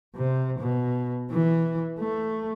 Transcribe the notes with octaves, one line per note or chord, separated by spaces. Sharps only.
C3
B2
E3
A3